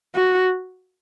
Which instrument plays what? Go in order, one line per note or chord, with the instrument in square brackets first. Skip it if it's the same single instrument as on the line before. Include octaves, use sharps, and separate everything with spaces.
[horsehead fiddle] F#4